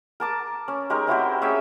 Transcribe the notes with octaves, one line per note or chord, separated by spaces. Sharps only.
A#4 A5 D6
C#4
G#3 D#4 G4 A#4
C4 E4 F#4 G4
C#4 G#4 E5 G5